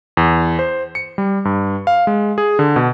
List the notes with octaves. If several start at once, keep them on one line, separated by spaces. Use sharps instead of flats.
E2
C5
C#7
G3
G2
F5
G#3
G#4
D3
B2